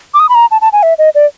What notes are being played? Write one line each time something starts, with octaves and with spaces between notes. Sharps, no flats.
D6
D#6
B5
A#5
A5
A5
G#5
E5
D#5
D5